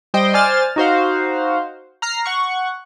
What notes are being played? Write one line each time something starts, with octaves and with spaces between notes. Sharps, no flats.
G3 C5 D#5 G5
C5 D5 G#5 F6 A6
D#4 F#4 C5 F5
A#5 F6 C7
F#5 C#6